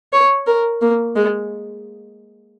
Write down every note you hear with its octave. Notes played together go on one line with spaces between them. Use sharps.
C#5
A#4
A#3
G#3